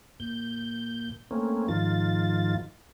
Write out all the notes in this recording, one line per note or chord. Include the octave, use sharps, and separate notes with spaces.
A#2 G6
A3 A#3 C4 C#4
G#2 D#3 F3 F4 A6